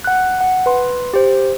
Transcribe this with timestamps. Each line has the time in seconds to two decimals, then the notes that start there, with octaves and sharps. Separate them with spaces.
0.04 F#5 F#6
0.41 F#5
0.66 B4 C6
1.14 G4 C5